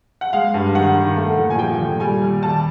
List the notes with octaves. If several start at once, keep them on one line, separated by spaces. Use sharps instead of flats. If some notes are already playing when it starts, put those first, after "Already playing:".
F#5
G#3 F5
G2
D#3 F#5
D#3
A3
A#2
G#5
F3 G5
A#2
G3 G#5
D#2
D#2 A5